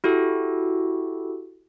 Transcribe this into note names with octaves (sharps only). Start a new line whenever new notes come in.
E4 F#4 G4 A4